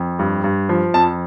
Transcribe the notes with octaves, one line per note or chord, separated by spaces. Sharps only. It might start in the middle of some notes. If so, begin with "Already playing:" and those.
Already playing: F2
G2
G2
F3
F2 A5